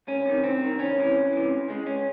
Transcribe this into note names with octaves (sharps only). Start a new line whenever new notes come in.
C2 C#4
C3 D#3
C2 C4
C3 D#3
C2 C#4
C3 E3
C2
C3 E3
C#2
C#3 G#3
C#2 C#4